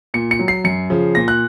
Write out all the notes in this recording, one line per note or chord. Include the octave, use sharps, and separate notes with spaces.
A#2 C#7
C#7
F#3
C7
F#2 C#7
C#3 F3
A#2 A#6
F#6